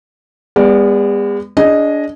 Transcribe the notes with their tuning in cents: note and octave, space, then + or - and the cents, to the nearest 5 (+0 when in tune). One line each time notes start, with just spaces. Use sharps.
G#3 -40 B3 +0 D5 -10
D4 -20 G#4 +0 D#5 +0